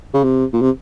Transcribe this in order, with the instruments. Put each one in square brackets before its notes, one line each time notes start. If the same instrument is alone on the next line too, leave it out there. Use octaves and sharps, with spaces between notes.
[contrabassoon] C#3
C3
A#2
C3